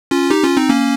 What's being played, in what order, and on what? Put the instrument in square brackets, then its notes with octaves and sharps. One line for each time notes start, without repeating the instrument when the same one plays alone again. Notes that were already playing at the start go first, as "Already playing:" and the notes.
[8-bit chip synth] C#4 F4
D#4 G4
C#4 F4
C4 D#4
A#3 C#4